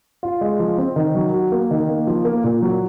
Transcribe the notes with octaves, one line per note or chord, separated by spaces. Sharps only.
F4
G#3
F3
C4
D#3
F#3
F#4
A#3
D#3
A#3
F3
A#3
A#2
F#3